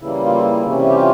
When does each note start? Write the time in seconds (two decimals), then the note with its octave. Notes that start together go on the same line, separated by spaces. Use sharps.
0.01 C#3 E3 G3 A#3 E4
0.25 F4
0.33 E4
0.63 C3 E3 G3 C#4
0.89 G4
0.95 F4